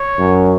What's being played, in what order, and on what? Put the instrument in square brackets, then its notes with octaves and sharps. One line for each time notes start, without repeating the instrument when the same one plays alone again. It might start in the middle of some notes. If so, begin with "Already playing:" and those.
Already playing: [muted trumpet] C#5
[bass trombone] F#2